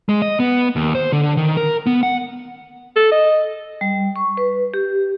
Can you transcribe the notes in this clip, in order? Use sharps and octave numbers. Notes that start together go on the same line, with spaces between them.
G#3
D#5
B3
D#2
C5
D3
D#3
A#4
B3
F#5
A4
D#5
G3
C#6
B4
G4